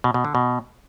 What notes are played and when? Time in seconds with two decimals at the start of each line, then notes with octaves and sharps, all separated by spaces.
0.04 B2
0.14 B2
0.25 D3
0.35 B2